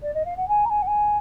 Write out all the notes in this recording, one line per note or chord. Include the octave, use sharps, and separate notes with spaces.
D5
D#5
F5
F#5
G#5
A#5
G#5
F#5
G#5